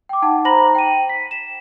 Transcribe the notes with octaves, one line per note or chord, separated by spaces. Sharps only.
G5 D6
D#4 F#5 A5
C5 A#5 B5 A#6 F#7
G5 D#7
B6
E7